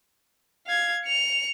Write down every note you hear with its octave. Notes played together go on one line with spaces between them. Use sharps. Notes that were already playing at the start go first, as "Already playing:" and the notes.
F5 G#6
C#7 F7